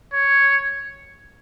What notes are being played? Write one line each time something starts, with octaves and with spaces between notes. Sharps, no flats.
C#5